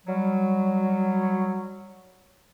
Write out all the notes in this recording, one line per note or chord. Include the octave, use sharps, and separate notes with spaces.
F#3 G3